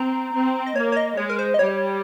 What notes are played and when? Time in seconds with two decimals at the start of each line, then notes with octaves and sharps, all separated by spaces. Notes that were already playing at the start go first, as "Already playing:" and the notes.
Already playing: C4 A#5
0.34 C4
0.66 D#5
0.76 A#3 C#5
0.92 C#5
0.97 D#5
1.17 G#3 C#5
1.29 A#4
1.39 C5
1.54 D#5
1.59 G3 C#5